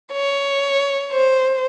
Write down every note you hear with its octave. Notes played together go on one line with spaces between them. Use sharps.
C#5
C5